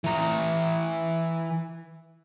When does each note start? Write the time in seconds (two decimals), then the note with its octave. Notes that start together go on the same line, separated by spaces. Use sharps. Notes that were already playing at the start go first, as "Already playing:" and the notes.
0.04 E3 A#5